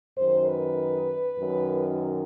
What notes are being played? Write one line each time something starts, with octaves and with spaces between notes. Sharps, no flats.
F#2 D#3 C5
B4
F#2 D#3